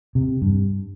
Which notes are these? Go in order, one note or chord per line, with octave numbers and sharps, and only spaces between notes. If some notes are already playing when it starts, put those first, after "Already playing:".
C3
G2